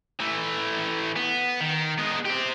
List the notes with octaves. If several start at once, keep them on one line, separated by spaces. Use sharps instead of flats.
E3 A3
B3
D#3
G#3 B3
C4 G4